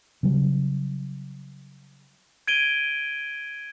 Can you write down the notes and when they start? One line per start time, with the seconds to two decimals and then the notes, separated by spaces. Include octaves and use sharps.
0.23 C#3 F#3 G3
2.47 G#6 D7 D#7 G7